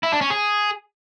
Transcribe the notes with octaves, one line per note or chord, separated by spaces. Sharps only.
E4
D4
C#4
G#4